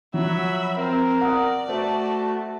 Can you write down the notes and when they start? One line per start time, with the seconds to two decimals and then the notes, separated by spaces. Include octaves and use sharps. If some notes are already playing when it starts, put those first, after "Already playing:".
0.14 F3 F#3 E5 B5
0.78 C4 A#4
1.21 D5 F#5 D#6
1.69 A3 F#4 C5 A5